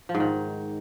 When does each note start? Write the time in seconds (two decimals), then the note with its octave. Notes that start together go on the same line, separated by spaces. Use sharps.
0.09 F3
0.15 G#2
0.20 D#3